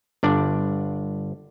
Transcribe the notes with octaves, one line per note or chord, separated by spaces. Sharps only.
G1 D4 D5